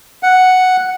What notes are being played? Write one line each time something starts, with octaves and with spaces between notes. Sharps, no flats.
F#5